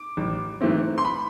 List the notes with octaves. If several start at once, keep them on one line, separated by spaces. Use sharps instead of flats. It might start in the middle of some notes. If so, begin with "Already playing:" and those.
Already playing: D6
A1
G#2 E3 A3 C4
C6
B5